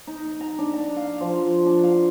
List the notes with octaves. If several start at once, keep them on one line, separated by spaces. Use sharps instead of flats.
D#4
A#5
D4
A#5
F5
F3
D4
F5